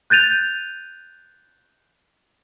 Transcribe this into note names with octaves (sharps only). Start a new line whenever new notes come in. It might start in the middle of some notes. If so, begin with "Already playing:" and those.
F#6 G6 A6 D#7 F7